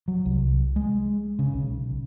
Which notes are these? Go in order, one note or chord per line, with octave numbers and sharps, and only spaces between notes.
F#3
C2
G#3
C#3
B1